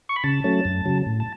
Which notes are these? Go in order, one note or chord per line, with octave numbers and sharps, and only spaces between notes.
C#6
B5
C#3 A5
F#3 A3 C#4
F#2
C#3 F#3
A2
A5